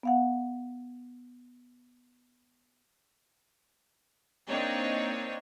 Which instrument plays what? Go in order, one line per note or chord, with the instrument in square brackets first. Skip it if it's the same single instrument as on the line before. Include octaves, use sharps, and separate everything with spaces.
[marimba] B3 F5 F#5
[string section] A#3 C4 D4 D#4 C#5